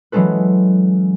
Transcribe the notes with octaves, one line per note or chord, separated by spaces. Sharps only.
E3 F#3 G#3 C#4 A4 B4